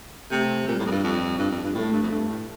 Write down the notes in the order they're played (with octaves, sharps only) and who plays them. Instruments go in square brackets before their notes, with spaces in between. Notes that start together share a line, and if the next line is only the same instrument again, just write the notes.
[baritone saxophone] C3 [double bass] A3
[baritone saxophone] A#2 [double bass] G3
[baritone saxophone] A2
F2
G2
F2
G2
F2
G2
[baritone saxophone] A2 [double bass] A3
[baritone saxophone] G2
F2
G2
A2